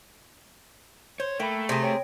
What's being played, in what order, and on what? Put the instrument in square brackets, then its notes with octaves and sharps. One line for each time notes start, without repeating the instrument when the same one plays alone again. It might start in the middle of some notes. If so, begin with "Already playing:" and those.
[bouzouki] C5 [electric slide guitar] C#5
[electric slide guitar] A3 [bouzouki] A#3 [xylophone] G5 B5
[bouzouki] C3 G#4 [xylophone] A#6
[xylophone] C#5 G5 D7